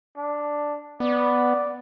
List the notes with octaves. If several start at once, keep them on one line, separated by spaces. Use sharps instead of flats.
D4
B3 D5